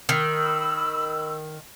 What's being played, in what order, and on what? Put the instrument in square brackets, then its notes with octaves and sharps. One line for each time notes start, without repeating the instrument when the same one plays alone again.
[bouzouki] D#3 [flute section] B5 E6